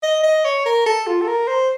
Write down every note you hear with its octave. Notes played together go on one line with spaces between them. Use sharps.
D#5
D#5
C#5
A#4
A4
F4
A4
A#4
C5